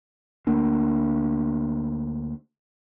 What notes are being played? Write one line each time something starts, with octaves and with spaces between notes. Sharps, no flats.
D2 A3 A#3 D4